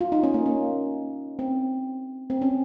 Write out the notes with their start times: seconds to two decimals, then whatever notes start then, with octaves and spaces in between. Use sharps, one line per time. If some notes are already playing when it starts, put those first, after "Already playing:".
0.01 F4
0.12 D#4
0.23 C#4
0.34 A#3
0.46 A#3
1.39 C4
2.30 C4
2.42 C#4